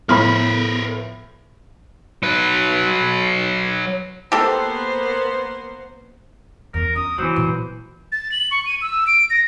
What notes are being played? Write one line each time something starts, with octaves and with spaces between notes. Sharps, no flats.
A2 F3 B3 A#4 B4 B5 C6 F6
F#3 B4
A#3 B3 G4 A4 C5
E2 A3 A#4
C#4 F4 D#6
E3 F#3 B3 C5
A#2 B3
A6
F#7
C#6
D#7
E6
D7
A#6